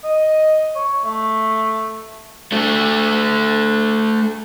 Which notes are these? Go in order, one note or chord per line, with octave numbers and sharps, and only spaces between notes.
D#5
C#5
A3
A3 D4